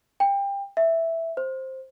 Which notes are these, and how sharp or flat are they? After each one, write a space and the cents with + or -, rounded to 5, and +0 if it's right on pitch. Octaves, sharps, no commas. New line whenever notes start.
G5 +25
E5 +0
C5 +5